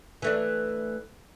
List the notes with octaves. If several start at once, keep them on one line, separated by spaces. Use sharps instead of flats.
E3 A3 D4